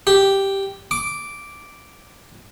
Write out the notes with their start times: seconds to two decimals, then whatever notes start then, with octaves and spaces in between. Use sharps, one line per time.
0.07 G4
0.91 D6